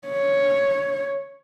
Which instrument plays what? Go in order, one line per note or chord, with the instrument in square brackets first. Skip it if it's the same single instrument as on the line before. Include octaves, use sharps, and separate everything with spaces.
[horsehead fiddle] C#5